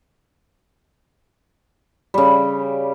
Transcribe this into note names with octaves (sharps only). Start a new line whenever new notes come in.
C#3 G3